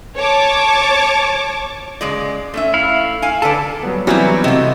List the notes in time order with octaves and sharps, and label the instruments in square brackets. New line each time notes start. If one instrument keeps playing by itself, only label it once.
[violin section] C#5 A5 C#6 D6
[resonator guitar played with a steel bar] C#3 G#3 D5
A3 C#4 E5
[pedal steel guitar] E4 F5
[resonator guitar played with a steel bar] F5 G#5
[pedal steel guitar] D3 A5 [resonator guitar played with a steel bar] A4 B4 D5
[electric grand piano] F#3 G3 B3
[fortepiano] E3 G3 F#4 [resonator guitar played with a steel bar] F#3 C4 E4 [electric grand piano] B3
[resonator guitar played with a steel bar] C3 A3 [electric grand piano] D#5 F#5